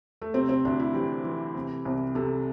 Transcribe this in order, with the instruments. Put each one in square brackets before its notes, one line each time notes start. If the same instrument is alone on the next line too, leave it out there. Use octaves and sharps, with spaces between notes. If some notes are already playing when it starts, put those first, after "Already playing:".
[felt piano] A3
C3 C4
C4
D2 D4
E4
E3 G4
E3
C3
C2
C3 A4